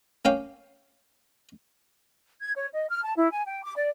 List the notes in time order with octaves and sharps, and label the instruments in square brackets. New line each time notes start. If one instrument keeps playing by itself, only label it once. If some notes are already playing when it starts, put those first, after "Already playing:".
[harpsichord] A#3 C#4 F5 G5
[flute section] G#6
C#5
D#5
F6
A5
E4
G#5
G5
D6
D5